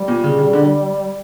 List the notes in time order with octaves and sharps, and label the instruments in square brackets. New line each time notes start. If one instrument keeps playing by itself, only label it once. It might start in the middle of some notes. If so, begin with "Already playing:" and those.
Already playing: [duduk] G3
[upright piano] A#2
C#3
C#3
D3